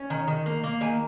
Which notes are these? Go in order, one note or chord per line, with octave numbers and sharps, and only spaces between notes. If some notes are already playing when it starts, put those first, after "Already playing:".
Already playing: C#4
D#3
D#3
A#3
A#3
D#3 G#5